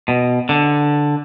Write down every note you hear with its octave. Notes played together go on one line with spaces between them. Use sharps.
B2
D3